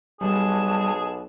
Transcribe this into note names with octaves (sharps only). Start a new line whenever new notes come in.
B1 G3 G#4 A5